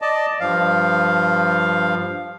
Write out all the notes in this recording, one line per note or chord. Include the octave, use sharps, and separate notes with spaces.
D5 D#5 A5
G2 F3 F5